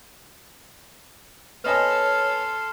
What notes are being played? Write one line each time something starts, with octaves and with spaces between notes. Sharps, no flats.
B3 A4 C#5 D#5 G#5 C6 F6